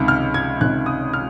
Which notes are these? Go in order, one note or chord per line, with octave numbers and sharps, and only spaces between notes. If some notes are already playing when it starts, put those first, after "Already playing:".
Already playing: C#2 C3 D#3
F6
G#6
C#2 C3 D#3 F#6
D#6
F6